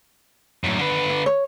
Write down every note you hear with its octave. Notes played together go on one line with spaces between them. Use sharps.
F#2 A2
D3 B4
D4
C#5